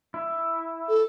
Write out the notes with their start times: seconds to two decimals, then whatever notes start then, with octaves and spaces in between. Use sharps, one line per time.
0.14 E4
0.89 A4